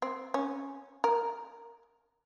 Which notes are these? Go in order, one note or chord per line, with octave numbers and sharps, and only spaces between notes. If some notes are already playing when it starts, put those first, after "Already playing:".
C4
C#4
A#4